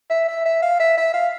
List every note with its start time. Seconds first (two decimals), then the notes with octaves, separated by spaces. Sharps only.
0.10 E5
0.28 E5
0.45 E5
0.62 F5
0.80 E5
0.97 E5
1.14 F5